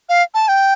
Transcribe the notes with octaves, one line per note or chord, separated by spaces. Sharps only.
F5
A5
G5